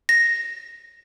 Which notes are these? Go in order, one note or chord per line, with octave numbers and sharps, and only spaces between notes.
A#6